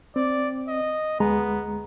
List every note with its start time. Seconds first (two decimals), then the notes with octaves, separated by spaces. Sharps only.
0.16 C4 D5
0.68 D#5
1.20 D2 G#3 B3 A#5